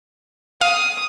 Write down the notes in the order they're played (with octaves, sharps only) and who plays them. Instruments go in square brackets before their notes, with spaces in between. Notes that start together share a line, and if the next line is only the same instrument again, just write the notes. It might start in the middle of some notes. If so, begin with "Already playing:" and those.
[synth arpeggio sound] F5 [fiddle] D#6